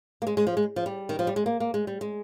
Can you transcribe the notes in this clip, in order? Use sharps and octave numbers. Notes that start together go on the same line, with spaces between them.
A#3
G#3
G#3
F3
G#3
F3
G3
D#3
F3
G3
G#3
A#3
A#3
G#3
G3
G#3